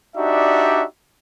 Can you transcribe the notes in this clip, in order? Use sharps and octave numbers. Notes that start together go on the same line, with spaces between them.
D4 D#4 F#4 G4 D5 E5